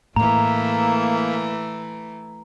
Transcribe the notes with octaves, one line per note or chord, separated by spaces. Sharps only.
A2 E3 A3 A#3 A#5